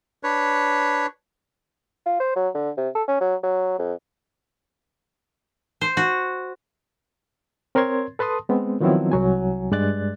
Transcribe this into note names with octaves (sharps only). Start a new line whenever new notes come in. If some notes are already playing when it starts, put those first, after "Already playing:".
D4 B4 C#5
F4
C5
F#3
D3
C3
A4
C#4
F#3
F#3
F2
C5
F#4
C4 A#4 C#5 C6 G#6
A4 B4 A5 C6 D#6
G#3 B3 C4
D#3 F3 F#3 B3 C4 E4
C2 F#3 G#5
G2 G#3 D5 F#6 A6